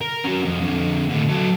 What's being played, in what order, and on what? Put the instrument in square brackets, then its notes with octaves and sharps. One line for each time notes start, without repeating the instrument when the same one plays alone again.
[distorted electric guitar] A#4
F#3 C#4
F2
F2 D3
A2 D3
F#3 A4